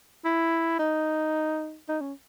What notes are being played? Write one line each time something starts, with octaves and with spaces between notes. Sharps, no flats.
E4
D#4
D#4
C#4